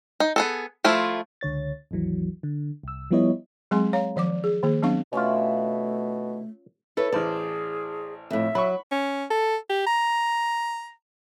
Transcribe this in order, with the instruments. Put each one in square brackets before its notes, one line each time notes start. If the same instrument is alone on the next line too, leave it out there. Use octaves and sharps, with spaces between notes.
[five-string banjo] D#4
B3 G#4 A4
F3 A3 E4 F4
[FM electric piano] C#2 D3 C#5 A6
G#1 D#2 E3 F#3
D3
C2 E6
F3 G3 B3 E4 C#5 D#5
[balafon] F#3 G#3 C4 G#4 G#5 C6
C#5 F5 A#5
D#3 F3 D5 D6
G#4
D#3 A#3 G#4
F#3 B3 C4 D4 F5 C#6
[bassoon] B2 [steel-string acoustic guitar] D#3 D4 E4 [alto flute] A3 [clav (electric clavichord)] C#4 F4
[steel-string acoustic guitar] E4 B4 C#5 [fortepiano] A4
[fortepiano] A1 C5 A5 [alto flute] G#4 [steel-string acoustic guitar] D5
[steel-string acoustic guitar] F2 A2 [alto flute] E5
[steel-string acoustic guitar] F#3 [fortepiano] B5 C#6
[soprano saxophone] C#4
A4
G4
A#5